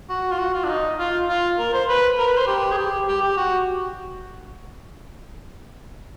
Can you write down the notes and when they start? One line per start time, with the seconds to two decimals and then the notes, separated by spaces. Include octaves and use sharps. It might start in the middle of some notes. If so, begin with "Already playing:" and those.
0.09 F#4
0.31 F4
0.39 F#4
0.54 F4
0.64 D4
0.69 D#4
0.99 F4
1.28 F4
1.59 A#4
1.73 C5
1.89 B4
2.18 A#4
2.28 B4
2.38 C5
2.47 G4
2.71 G#4
2.78 G4
3.08 G4
3.22 G4
3.37 F#4